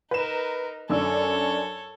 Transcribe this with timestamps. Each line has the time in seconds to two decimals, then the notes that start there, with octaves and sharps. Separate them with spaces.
0.11 D#4 A#4 B4 E7
0.89 F#2 D4 A4 C#5 E6